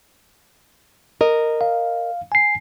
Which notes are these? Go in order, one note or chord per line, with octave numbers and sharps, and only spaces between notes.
A#4 D#5
F5
G#5 C7